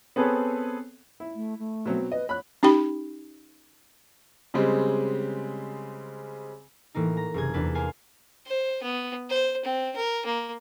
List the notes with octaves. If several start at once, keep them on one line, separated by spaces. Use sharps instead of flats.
B3 C4 G#4 A4 B4 C#5
E4
A3
A3
B2 F#3 C4
B4 D#5
C#5 B5 F#6
C#4 D#4 G4 G5 B5
C#3 G3 G#3 C4
A2 E3 A#3 D#4
A#5
F#1 C3 G#4 G#6
E2 D4 B4
A#3 C5 F5 G#5
C5
B3
C5
C4
A#4
A#3